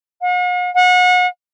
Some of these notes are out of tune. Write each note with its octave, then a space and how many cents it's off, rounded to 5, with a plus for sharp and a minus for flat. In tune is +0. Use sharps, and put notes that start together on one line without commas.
F#5 -45
F#5 -35